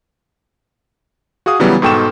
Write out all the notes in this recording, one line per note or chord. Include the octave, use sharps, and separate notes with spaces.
F#4 G#4 F5 D#6
C#3 E3 F#3 G3 B3
G#2 B2 A4 G5 C#6 E7